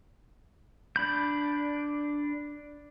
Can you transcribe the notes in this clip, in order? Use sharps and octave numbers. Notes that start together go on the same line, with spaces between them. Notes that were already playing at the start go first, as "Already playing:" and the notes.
D4 B5 G6